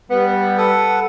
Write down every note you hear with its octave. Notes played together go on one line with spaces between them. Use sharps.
G3 B3
A4 B4 F#5